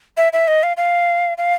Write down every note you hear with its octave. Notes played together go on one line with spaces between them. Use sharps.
E5
E5
D#5
F5
F5
F5